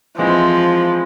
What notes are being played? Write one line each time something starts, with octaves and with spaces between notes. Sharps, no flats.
E3 F3 G#3 C4 E4